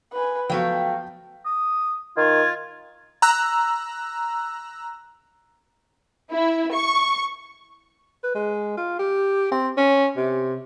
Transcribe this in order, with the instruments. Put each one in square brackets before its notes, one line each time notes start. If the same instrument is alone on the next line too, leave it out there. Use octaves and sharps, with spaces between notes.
[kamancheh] B4 G#5
[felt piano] F3 B3 [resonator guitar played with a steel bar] F#3 A3 F#4 [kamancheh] F5 [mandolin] G5
[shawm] D#6
[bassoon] D#3 [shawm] F4 [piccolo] G#6
[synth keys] A#5 E6 F#6
[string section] E4
C#6
[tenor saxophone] B4
G#3
F4
G4
C4
C#4
C3